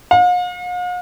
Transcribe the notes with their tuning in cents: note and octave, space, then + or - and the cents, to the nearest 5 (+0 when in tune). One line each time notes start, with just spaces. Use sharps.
F5 +45